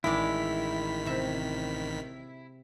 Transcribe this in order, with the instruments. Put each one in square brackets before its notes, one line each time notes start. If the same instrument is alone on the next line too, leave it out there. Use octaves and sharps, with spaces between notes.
[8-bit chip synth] A1 D#3 B6 [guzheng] G#3 D5 [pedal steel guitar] E4
[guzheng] C3 E5